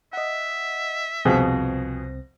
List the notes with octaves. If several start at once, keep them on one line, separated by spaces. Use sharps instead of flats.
D#5 E5 F#5
C2 F2 B2 C4 G#4 A#6